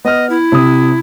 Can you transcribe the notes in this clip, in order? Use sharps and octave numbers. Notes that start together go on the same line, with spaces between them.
B3 D#5 F6
E4
C3 D#6